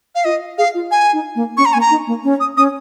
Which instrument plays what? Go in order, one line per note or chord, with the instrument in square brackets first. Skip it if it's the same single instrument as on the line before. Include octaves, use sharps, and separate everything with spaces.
[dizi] F5
[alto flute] F4 [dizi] D#5
[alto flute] G#4 [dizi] F5
[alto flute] F4
[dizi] G#5
[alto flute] D#4
A#3
[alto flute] C#4 [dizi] C#6
[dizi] A#5
[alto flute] A#3 [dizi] G#5
[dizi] A#5
[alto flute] D#4
A#3
C#4
[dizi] D#6
[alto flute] C#4 [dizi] D#6